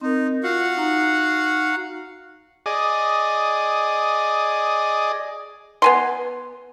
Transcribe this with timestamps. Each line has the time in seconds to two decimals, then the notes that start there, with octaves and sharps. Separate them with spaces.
0.01 C4 D#4 A#4
0.44 F4 F#4 F5 F#5
0.77 D#4 A#5
2.66 G#4 D5 D#5
5.82 B3 G#5 C6